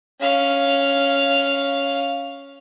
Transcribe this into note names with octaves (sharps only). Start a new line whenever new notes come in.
C#4 F5